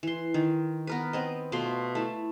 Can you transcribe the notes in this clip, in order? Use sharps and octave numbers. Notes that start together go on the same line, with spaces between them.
E3 C6
D#3
B3 A#4 B4
B3 C4 D#5
B2 A3 F4 C6
A3 E4